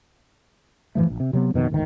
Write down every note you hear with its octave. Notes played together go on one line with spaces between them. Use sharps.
G#2 E3 F3 A3
E1 A#1
C3
C3 F#3 G#3 B3
F2 B2 D#3
G1 D2 G#2 D#3